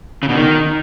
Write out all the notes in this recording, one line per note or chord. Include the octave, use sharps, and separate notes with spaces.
C#3
B2
D#3